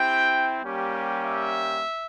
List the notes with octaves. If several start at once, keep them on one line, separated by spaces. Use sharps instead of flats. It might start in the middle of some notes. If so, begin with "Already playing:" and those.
Already playing: C4 E4 G4 G5
G3 A#3 C#4 G4
E5